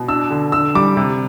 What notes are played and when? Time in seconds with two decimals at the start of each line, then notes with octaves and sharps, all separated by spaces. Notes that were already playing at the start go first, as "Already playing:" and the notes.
Already playing: B2
0.08 D4 E6
0.30 D3
0.52 D3 E6
0.75 G3 D6
0.97 C3